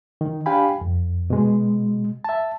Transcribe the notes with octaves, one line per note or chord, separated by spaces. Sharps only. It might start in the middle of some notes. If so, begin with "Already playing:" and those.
D#3
D4 G4 F5 G5 G#5 B5
F2
B2 G#3
E5 A5